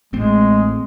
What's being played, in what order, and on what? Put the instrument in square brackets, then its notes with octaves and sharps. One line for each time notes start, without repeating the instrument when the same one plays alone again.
[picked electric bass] A1 A3 C4 [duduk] G#3